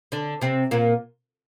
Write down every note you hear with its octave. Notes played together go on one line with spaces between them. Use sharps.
D3 D4
C3 C4
A#2 A#3